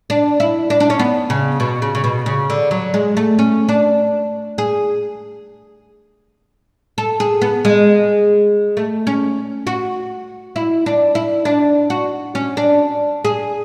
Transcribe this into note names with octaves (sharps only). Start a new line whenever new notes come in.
D4
E4
D4
D4
C#4
B3
C#3
B2
C#3
C#3
B2
C#3
D3
F#3
G#3
A3
C#4
D4
G#4
A4
G#4
B3
G#3
A3
C#4
F#4
E4
D4
E4
D4
F#4
C#4
D4
G#4